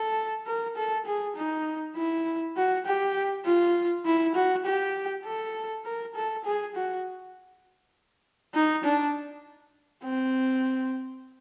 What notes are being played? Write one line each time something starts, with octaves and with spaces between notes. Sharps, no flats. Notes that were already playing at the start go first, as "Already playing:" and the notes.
Already playing: A4
A#4
A4
G#4
D#4
E4
F#4
G4
F4
E4
F#4
G4
A4
A#4
A4
G#4
F#4
D#4
D4
C4